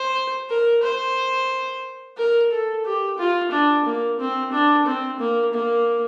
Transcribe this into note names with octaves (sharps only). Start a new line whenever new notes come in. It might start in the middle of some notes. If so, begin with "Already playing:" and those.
Already playing: C5
A#4
C5
A#4
A4
G4
F4
D4
A#3
C4
D4
C4
A#3
A#3